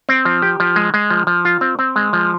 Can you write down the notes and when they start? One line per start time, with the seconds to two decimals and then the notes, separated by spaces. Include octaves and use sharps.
0.09 C4
0.25 F3
0.42 G4
0.60 F3
0.76 G#3
0.94 G#3
1.10 F3
1.27 F3
1.45 F4
1.61 C4
1.79 C4
1.96 G#3
2.13 F3